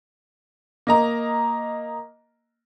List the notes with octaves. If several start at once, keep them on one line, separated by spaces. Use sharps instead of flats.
A#3 D#5 A#5